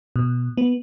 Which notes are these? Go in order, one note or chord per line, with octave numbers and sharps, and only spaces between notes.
B2
B3